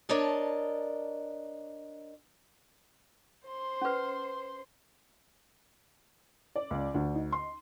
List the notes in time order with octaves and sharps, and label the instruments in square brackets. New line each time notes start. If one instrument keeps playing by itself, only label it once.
[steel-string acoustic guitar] D4 A#4 C#5 D#5 A5
[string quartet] C5 C6
[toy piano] C#4 B4
[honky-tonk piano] D5
[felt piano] C#2
[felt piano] D2 [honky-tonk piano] D4
[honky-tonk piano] D#4
[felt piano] C6